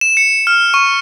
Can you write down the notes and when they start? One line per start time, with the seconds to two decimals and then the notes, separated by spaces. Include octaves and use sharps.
0.01 E7
0.17 C#7
0.47 F6
0.74 C#6